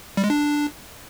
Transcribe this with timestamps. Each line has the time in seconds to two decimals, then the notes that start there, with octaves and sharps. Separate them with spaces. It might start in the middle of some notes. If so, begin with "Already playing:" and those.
0.17 G3
0.24 G#3
0.30 D4